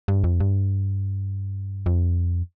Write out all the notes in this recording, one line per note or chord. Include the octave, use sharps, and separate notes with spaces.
G2
F2
G2
F2